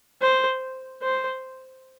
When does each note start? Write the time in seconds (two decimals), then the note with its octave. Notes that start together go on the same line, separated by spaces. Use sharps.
0.22 C5
1.02 C5